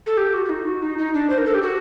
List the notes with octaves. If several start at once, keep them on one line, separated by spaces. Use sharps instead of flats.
A4
G4
F#4
F#4
D#4
F#4
D#4
D#4
D4
C5
A#4
A4
G4
F#4